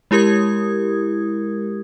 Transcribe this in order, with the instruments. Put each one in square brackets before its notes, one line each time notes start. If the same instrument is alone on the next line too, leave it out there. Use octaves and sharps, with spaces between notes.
[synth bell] G#3 E4 G4 A#4 D#6 G#6